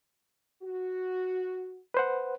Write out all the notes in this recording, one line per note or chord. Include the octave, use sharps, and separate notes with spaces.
F#4
B4 C5 F#5